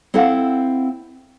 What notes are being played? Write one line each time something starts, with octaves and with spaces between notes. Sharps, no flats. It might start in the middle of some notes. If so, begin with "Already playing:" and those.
C4 E4 A4 F5 F#5